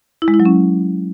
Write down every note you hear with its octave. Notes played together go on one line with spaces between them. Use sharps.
E4
G#3
E4
F#3
C#4